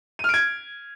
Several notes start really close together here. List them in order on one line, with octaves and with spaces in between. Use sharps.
D#7 F6 D7 G#6